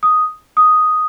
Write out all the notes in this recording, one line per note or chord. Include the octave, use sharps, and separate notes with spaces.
D#6
D#6